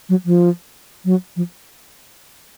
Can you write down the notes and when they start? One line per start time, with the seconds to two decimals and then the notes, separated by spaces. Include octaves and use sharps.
0.09 F#3
0.25 F3
1.05 F#3
1.36 F3